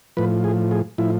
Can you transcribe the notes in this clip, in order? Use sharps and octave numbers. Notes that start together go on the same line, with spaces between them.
A2 F3 B4
G#4
G#4
A2 F3 E4